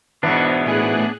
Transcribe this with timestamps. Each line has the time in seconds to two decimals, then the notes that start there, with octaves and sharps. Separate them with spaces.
0.23 G#2 B2 E3 B3 D4
0.66 A2 G#4 F#6